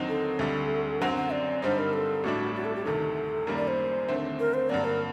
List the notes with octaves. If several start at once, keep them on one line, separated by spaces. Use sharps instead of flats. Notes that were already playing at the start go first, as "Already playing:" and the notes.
Already playing: D#2 D3 F#3 C4 D#4
A4
D2 D3 G3
F#2 D3 F#3 C4 F#5
F#5
D5
G2 D3 G3 C4 D#4 C5
A#4
A4
A1 A2 G3 D4 F#4
F#4
A4
G4
D2 C3 D#3 A4
F#2 D#3 G3 A#3 A#4
D5
C5
D#2 D3 A3 C4
A#4
C5
G2 D3 F#3 A#3 D5
A#4